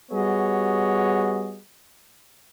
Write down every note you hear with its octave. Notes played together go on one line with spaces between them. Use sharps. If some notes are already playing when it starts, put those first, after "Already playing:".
G3 B3 F#4 G#4 C#5 D#5